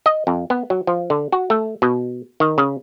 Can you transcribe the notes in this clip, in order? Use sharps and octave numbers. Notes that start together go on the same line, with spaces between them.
D#5
F2
B3
F#3
F3
D3
F#4
A3
B2
D#3
C#3